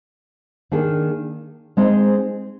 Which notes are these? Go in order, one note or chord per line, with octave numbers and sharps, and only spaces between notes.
D#3 A#3 D4 G#4
G#3 C4 D#4 G#4 C5